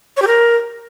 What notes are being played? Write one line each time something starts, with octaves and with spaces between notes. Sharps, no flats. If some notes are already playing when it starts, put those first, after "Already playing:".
C#5
G4
A#4